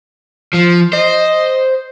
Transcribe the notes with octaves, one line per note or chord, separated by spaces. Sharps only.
F3
C5 D#5